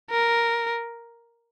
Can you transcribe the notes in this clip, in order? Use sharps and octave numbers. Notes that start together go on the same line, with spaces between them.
A#4